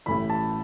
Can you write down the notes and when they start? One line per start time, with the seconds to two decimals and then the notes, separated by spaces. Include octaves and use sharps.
0.06 A1 A2 E3 B5
0.30 A5